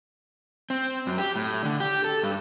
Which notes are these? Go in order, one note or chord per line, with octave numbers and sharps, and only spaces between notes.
C4
F#2
G4
A2
D3
G4
A4
G2